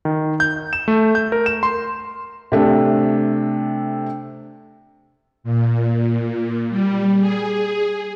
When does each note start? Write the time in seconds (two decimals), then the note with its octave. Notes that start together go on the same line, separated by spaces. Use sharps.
0.05 D#3
0.40 G6
0.73 E7
0.88 A3
1.15 G6
1.32 A#4
1.46 E7
1.63 C6
2.52 C3 A3 D4
5.44 A#2
6.70 G3
7.20 G#4